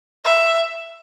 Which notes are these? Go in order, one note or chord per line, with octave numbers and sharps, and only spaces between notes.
E5